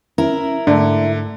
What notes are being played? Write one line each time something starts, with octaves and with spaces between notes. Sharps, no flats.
C#4 E4 A#4
G#2 D3 A3 D4